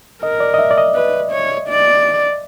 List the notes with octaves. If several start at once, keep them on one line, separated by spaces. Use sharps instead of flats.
A#4 D#5
D5
D#5
E5
D5
D#5
B4
C#5
D5